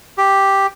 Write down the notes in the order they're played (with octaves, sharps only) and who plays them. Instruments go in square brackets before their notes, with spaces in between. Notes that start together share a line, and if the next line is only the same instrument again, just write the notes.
[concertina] G4